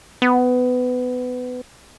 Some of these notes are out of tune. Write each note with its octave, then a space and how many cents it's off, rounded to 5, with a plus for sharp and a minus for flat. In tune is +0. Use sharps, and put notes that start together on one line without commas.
B3 +20